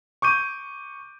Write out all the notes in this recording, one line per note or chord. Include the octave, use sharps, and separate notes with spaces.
C#6 D6 G6 D#7